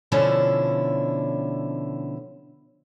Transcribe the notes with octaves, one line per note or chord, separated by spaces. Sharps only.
B2 D3 F3 C#4 E4